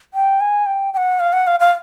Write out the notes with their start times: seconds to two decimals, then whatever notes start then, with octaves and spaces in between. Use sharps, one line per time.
0.14 G5
0.40 G#5
0.66 G5
0.94 G5
0.97 F#5
1.20 F5
1.33 F#5
1.47 F5
1.60 F5